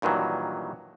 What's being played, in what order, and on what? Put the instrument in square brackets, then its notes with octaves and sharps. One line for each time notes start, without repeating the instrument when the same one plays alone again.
[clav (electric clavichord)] G2 A#2 D#3 E3 F#3